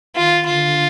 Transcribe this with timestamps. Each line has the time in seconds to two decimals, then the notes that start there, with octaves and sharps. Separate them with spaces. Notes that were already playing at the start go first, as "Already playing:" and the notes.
0.16 D#3 F4
0.45 D3 F4